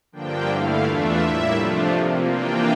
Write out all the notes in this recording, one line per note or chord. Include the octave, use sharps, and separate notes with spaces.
G2 D3 F3 A#3 D4 G5
G2 D3 A3 E4 F5
E2 E3 A3 D4 F4 E5
A2 G3 A#3 E4
C3 F3 A3 D4 F4
C3 F3 A#3
C3 E3 A#3 D4 F4 G5